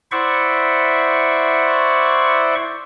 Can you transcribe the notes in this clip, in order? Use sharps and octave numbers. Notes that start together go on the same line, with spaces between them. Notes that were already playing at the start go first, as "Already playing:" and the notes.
E4 C5 D5 E5 F#5 C#6